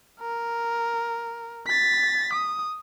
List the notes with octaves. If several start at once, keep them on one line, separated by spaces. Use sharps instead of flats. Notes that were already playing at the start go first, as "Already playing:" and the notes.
A#4
A6 B6
D#6